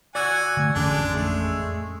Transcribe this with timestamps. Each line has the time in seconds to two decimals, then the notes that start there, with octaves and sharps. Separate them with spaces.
0.15 F#4 D5 F#5 G#5 E6 G#6
0.57 D3 E3 A3
0.75 A1 F2 D3 G#3 C#4 D4
1.15 G#3 A3